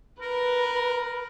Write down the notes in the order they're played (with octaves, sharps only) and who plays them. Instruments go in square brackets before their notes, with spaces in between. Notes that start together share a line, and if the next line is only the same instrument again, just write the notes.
[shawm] A#4 [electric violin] B4